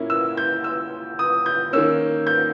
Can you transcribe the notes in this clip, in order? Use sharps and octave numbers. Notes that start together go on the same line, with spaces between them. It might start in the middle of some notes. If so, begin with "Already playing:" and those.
Already playing: A#2 A#3 C#4 E4
E6
G6
E6
D#6
G6
D#3 A#3 C#4 E6
G6